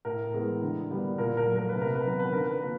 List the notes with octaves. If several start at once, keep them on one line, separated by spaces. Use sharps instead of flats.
A2 A#4
E3 G#3 B3
D3
G3 B3
A#2 A#4
A#4
F#3 A3
A#4
B4
C3
A#4
B4
D#3 F#3 B3 A#4
B4
D3 A#4
B4
F3 A#3 A#4